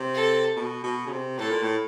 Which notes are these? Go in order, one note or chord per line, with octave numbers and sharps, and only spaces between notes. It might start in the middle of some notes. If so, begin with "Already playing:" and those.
Already playing: C3
A4
B2
B2
C#3
C3
A2 A4
A#2
A2